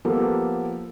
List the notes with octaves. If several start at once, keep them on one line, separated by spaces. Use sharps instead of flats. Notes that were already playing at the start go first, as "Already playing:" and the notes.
F3 A#3 B3 G4 A4